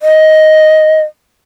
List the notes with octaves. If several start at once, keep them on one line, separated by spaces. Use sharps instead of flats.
D#5